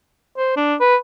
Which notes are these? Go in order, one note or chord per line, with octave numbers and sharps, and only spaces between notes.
C5
D4
B4